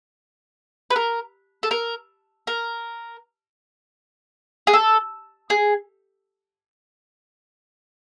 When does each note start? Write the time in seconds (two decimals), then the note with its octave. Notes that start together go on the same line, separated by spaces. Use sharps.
0.90 B4
0.96 A#4
1.63 A4
1.71 A#4
2.47 A#4
4.67 G#4
4.73 A4
5.50 G#4